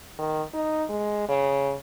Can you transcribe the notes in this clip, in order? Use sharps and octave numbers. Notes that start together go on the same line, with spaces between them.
D#3
D#4
G#3
C#3